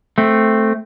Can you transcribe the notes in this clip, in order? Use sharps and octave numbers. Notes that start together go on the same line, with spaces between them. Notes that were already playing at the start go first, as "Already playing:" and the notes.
A3 C4